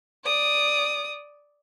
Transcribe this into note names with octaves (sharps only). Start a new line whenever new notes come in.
D5 D#6